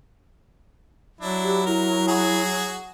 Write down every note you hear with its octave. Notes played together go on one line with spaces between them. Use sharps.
F#3 D4 E4
G4
E4 A#4
F#4 G#4